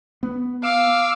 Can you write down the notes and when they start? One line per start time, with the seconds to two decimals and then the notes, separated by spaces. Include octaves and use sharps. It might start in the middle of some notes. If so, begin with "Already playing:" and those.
0.23 B3
0.64 F5 D6 E6